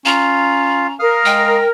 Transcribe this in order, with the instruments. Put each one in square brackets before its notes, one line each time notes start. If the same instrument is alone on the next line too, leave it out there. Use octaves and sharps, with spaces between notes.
[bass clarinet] C#4 [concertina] F4 F5 [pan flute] A#5
[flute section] A#4 [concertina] F5 D#6 F6
[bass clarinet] G#3 [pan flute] G5